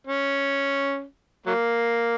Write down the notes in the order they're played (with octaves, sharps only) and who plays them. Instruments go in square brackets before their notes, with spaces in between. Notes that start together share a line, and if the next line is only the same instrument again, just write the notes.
[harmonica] C#4
F#3 A#3